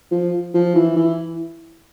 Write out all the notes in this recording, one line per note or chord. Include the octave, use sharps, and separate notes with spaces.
F3
F3
E3
E3